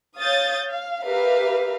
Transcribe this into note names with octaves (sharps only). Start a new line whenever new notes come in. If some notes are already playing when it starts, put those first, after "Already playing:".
C#5 F5 D#6 G6 A6
F5
G4 A#4 B4 E5 F5